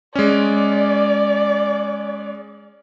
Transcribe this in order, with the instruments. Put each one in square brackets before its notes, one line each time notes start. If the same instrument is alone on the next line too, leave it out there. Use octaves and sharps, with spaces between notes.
[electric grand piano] G#3 C#4 [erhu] D5